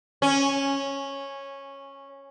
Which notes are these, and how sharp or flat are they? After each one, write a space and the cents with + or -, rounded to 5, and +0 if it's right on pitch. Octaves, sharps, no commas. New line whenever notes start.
C#4 -10